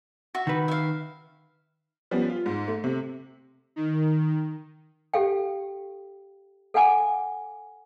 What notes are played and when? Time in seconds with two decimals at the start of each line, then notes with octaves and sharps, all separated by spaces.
0.35 F#4 E5
0.47 D#3 B4
0.68 E5 F5
2.11 F3 G3 B3 C#4
2.30 F4
2.46 G#2
2.68 A3
2.84 C3
3.76 D#3
5.14 G4 A4 F5 G5
6.74 A4 F5 F#5 G#5 D6